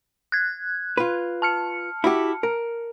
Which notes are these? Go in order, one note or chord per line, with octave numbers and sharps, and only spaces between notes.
F#6 G#6
F4 B4
A5 F6 C#7
E4 F#4 G4
A#4